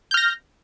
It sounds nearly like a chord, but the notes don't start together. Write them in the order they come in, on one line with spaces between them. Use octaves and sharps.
G6 F6 A#6